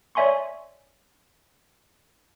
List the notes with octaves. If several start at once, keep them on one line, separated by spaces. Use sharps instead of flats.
C#5 D5 E5 G#5 C6 C#6